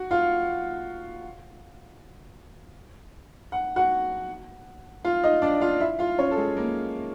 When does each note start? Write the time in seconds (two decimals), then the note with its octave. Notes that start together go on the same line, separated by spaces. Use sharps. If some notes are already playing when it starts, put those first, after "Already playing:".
Already playing: F#4 F#5
0.11 F4 F5
3.52 F#5
3.76 F#4 F#5
5.05 F4 F5
5.24 D#4 D#5
5.42 D4 D5
5.61 F4 F5
5.80 E4 E5
5.99 F4 F5
6.18 C#4 C#5
6.31 A4
6.37 G#3 G#4
6.57 A#3 A#4